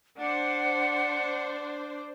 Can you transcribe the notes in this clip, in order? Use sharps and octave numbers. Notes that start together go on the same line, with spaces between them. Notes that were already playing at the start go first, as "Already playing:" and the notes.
D4 C5 F#5